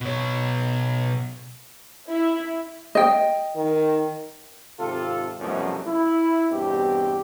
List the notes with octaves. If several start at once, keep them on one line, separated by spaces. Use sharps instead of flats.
B2 C#5
E4
D#5 G5
D#3
G#1 C3 F4 A4
C2 F#2 B2 F3 F#3 A3
E4
E2 G2 B2 C4 G4